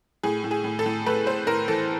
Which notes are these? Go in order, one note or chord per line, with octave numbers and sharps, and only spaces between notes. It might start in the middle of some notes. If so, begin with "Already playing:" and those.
A2 G#4
A2
G#4
A2
A4
A2
A3 B4
A3 C5
A2 A#4
E3 A4